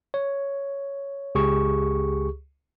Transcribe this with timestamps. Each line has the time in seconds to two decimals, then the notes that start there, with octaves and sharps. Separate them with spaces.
0.14 C#5
1.35 C#2 G4 G#4 C#6